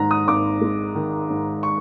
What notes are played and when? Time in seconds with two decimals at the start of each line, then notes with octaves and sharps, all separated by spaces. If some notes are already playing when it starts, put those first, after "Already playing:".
Already playing: G#2 D#3 A#5
0.11 D#6
0.27 G#1 D6
0.61 G#3
0.95 D#3
1.30 G#2
1.63 C#6